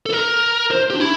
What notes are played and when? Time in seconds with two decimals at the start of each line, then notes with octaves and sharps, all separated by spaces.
0.06 A4
0.13 A#4
0.71 C5
0.90 G4
0.96 D4
1.00 E4